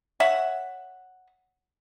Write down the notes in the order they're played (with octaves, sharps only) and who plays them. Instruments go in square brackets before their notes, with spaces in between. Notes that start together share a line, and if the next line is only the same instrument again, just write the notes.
[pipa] C#5 E5 F#5